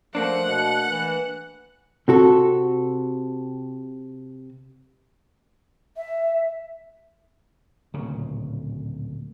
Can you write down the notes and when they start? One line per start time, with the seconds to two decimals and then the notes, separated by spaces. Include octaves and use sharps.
0.15 F3 A3 A#3 D4 F#5
0.48 B2
0.89 E3
2.08 C3 F#4 A4
5.97 E5
7.94 D1 A#2 C#3